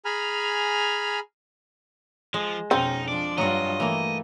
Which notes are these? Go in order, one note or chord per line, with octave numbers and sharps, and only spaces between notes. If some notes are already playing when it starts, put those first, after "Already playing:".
G#4 G#5 A#5 B5 F6
F3 G#3
F2 B2 C4 C#4 D#4
F3 D4 D5
G2 F#3 F4 F#4 D#5
E3 A3 A#3